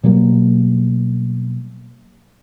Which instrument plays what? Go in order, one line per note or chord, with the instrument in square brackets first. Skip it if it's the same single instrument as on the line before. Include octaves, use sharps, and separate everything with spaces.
[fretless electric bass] B2 F#3 G3 A#3